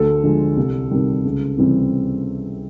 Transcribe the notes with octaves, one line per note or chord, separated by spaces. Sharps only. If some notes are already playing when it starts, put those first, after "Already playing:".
Already playing: D2 A4
D3 F3 G#3
C2
C3 D#3 G3
C#2
C3 E3 G3 C4